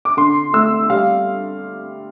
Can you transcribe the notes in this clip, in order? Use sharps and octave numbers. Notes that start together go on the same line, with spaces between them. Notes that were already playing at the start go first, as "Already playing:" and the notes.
D6
D3 C6
A3 E6
G3 F5